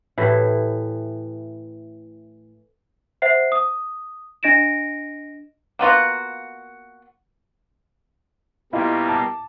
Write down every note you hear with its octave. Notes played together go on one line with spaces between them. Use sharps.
A2 E3 E4 G4
C5 E5 F#5 C7
D#6
D4 D#5 A#6 D7 E7
A#3 B3 F4 F#4
B2 G3 A#3 E4 F4 D#5
A5 D6